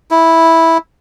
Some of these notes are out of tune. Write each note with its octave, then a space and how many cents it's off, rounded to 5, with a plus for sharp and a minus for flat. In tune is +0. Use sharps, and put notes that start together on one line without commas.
E4 -10